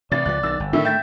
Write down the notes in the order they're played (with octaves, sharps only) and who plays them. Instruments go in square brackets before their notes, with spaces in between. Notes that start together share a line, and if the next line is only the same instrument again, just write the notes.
[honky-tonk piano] A1 A6 [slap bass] C3 [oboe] D5
[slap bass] C#2 E3 F3 [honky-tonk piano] F#6
[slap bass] B1 D#3 [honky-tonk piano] E6 A6
[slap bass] G1
[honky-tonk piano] A2 D3 D#3 [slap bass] A3 [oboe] E5
[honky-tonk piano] E5 A6 [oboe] G5